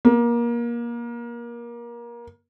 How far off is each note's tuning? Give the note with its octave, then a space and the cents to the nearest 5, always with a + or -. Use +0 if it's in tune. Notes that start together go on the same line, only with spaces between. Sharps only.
A#3 +25